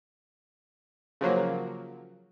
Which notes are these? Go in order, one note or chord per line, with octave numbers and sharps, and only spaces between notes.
C#3 F3 F#3 A#3